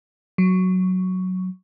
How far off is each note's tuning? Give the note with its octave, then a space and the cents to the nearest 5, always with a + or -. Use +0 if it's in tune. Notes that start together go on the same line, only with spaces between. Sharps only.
F#3 +0